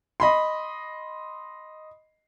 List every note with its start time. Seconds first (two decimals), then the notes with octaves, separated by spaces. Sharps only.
0.20 D#5 B5 C6